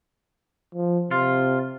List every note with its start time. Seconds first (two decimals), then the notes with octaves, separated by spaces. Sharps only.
0.74 F3
1.11 C3 F4